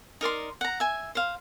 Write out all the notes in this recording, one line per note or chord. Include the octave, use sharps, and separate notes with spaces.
D#4 A#4 D5 C6
F#5 A#5
E5 G#5
C5 F5